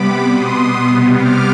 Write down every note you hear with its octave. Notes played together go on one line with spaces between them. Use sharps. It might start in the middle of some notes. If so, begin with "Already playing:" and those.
Already playing: C3 G3 B3 B5 D6
B2 B3 C6 D#6
C3 G3 B3
D6 F6